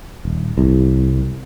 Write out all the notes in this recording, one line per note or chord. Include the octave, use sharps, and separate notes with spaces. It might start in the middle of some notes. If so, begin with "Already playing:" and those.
D#1
C2